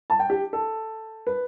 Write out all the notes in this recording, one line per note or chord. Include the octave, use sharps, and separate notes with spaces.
A5
G5
G4
A4
B4